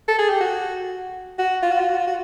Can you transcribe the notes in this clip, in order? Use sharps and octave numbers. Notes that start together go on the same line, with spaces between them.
A4
G#4
G4
F#4
F#4
F4
F#4
F4
F#4
F4
F#4